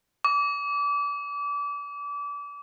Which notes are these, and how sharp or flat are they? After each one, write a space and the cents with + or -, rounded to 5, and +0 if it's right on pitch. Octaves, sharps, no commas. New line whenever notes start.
D6 -30